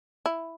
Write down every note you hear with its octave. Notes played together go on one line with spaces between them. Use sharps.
E4